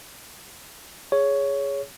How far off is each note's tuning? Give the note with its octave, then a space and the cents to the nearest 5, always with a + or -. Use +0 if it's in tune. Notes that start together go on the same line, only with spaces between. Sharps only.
G#4 +0 C#5 +10